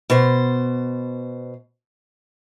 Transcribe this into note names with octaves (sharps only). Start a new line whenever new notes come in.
B2 C5